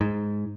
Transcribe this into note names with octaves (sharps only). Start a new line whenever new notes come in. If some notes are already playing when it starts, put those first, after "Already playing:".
G#2